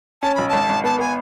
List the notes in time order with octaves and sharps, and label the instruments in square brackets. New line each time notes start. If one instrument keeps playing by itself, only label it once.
[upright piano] C#4 [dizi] A5
[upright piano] B1 [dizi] B5
[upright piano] G#1 [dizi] A5
[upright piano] G#1
[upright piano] B3 [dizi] A5
[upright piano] B3 [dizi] G#5